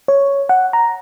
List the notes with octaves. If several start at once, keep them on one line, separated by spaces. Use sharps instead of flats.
C#5
F#5
A#5